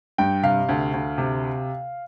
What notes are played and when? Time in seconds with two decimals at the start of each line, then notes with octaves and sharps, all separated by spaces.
0.18 G2 G5
0.43 C3 F5
0.69 D2
0.93 D2
1.18 C3